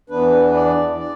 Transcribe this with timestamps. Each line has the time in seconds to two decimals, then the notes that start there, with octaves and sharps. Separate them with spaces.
0.10 E2 E3 B3 D4 B4
0.54 D5
0.99 D5